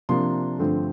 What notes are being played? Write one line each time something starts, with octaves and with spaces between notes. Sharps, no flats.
C3 F3 A#3 D4 C6
G2 D3 F3 A3 C4